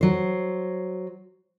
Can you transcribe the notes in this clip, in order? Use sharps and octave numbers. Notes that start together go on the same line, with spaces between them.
F#3 C5